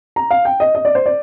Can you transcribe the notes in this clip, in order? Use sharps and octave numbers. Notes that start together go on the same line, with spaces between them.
A#5
F5
G5
D#5
D#5
D5
C5
D5